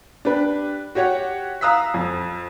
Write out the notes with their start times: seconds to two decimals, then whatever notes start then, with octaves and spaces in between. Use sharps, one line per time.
0.25 D4 G4 B4
0.95 F#4 G4 C#5 F#5
1.61 F5 A#5 D#6 E6 F#6 B6
1.94 F2